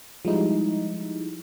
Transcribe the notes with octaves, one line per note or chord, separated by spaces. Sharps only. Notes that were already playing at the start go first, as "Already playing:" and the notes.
F3 G3 G#3 D#4 E4